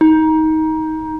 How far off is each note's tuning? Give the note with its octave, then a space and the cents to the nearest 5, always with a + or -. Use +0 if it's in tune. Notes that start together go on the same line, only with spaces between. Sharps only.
D#4 +20